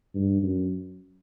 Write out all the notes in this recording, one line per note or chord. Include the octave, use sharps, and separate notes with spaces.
G2
F#2